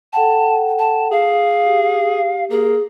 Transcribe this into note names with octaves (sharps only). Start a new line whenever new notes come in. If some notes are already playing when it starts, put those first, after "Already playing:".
A4 F#5 G5 A5
A5
G#4 F5
G4
A#3 G#4